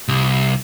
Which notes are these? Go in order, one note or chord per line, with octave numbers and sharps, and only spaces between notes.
C2